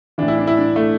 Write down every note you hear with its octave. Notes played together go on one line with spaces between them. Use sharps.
A2 E3 D4
E4
D4
E4
D4
A3